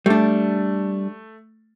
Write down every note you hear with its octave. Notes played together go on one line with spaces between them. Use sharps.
G3 A3 D4